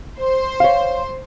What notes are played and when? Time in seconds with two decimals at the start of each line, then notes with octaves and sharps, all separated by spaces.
0.20 C5
0.60 C#5 F5